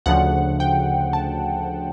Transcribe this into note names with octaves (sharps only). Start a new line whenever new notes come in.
D2 C#3 F3 F#5
G5
A5